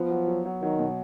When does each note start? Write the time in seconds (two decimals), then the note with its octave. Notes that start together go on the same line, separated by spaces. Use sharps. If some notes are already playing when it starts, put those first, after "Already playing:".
Already playing: F3 B3
0.10 F#3
0.27 F#3
0.45 F#3
0.62 D#3 F#3
0.79 B2